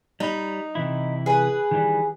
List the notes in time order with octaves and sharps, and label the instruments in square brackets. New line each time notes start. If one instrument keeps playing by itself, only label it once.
[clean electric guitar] G3 B5 [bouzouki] D#4
[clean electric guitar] C3 E3 E4
[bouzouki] G#4 B4
[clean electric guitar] D#3 E3 G3